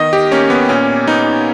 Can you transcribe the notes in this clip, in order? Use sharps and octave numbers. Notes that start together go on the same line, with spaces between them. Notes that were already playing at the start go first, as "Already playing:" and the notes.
Already playing: D#3 B3 D#5
G4
A#3 C#4
B3
A#2 C#4
B3 D#4